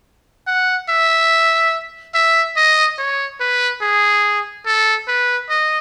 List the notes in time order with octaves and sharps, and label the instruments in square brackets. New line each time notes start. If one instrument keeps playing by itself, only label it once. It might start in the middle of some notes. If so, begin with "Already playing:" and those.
[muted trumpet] F#5
E5
E5
D#5
C#5
B4
G#4
A4
B4
D#5